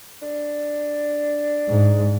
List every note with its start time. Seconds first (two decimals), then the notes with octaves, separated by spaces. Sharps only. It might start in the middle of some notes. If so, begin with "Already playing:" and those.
0.22 D4
1.69 G#2